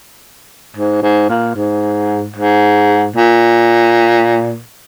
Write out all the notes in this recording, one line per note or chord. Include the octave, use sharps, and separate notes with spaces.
G#2
G#2
A#2
G#2
G#2
A#2